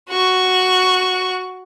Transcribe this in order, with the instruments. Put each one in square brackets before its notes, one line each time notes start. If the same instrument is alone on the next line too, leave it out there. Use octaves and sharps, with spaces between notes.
[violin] F#4 C#6